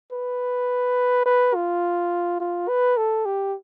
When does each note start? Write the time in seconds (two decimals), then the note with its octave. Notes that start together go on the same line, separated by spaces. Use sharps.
0.12 B4
1.26 B4
1.55 F4
2.40 F4
2.68 B4
2.97 A4
3.25 G4